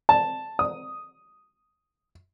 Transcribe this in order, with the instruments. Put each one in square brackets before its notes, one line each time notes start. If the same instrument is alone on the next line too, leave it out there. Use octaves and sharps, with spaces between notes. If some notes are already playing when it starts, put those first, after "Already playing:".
[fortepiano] A5
D#6